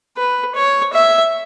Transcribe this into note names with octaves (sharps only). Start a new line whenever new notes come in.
B4
C#5
E5